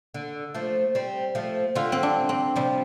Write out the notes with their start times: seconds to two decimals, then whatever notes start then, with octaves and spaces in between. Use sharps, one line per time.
0.14 D3
0.54 F3 A3
0.95 G3 C4
1.35 F3 A3
1.75 D3 G3 F4
1.92 C4
2.03 D4
2.29 C4
2.56 C3 F3 G3